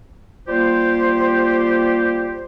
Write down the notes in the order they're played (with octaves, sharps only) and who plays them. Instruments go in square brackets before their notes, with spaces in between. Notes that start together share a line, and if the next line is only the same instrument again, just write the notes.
[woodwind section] G3 A#3 F4 G4 C5